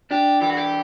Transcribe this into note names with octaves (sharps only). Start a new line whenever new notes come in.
D4 G4
E3 G4
F#4
G4